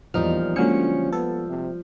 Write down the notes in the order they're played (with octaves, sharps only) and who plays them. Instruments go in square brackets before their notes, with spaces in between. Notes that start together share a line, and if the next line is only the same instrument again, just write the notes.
[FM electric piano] E2 D#4 F6 [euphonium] A#2 [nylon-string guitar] F3 G3
[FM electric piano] D3 F#3 C#7 [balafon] G#3 A#3 F4 [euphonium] C#4
[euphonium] B3 [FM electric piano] A4 [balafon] B4
[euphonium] C3